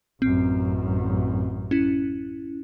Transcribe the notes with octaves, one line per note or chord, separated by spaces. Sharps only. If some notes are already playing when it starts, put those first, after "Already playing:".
A1 F#2 C4
C#4 E4